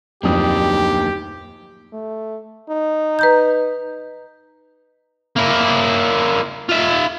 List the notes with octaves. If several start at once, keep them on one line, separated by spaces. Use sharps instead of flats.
D1 F2 A#3 D4 D#4 G4 D#6
A3
D#4
B4 A#5 G6
A#3 E4
F4 E5